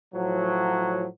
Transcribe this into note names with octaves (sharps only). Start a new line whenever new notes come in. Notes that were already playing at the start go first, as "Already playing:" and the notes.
A2 F3 F#3